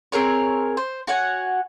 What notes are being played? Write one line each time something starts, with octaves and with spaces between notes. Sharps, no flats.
C4 G#4 A#4 C#5
C5
F#4 C#5 F#5 G#5